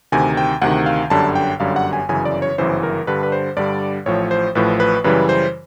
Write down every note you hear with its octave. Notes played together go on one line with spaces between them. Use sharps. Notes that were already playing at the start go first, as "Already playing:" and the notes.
D2 C3 D#3 G#5
G5
D2 C3 D#3 F#5
F5
G1 F#2 D3 G3 A5
G5
G1 F#2 D3 G3 F5
F#5
G#5
G1 F#2 C#3 E3 G#5
D5
C#5
G1 F#2 C#3 E3 C5
A#4
G2 D3 G3 B4
B4
C5
G2 D3 G3 D5
A1 A2 F3 C#5
C5
A1 A2 F3 B4
B4
F#2 C#3 E3 G3 B4
C5